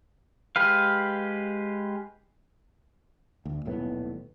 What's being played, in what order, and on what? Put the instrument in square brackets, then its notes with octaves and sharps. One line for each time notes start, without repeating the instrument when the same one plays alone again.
[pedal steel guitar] G#3 G4 B4 F5
[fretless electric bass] D2
D#1 B1 A2 B3